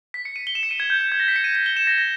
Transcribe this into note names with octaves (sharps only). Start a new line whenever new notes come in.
B6
C#7
D#7
G7
E7
C#7
D#7
G#6
G6
G6
G#6
A#6
B6
C#7
D#7
D#7
G7
E7
A#6
A#6